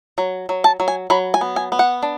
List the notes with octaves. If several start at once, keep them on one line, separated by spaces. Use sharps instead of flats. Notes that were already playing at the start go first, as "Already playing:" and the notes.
F#3
F#3
A5
F#3
G#5
F#3 B5
G#5
B3
G#5
B3
F#5
D4